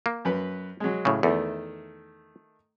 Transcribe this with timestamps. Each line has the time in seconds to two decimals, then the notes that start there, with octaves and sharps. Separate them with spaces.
0.06 A#3
0.25 F#2 B4
0.80 F#3 G#3
1.05 A2 C#3
1.23 E2 D#3 A3 A4